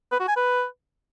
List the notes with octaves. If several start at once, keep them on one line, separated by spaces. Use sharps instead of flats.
B4
F#4
G#5
B4